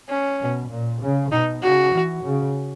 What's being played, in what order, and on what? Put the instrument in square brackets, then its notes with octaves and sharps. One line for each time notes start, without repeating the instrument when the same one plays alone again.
[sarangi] C#4
[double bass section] B2
A#2
C#3
[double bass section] B2 [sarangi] D#4
[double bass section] C#3 [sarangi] F#4
[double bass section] E3
C#3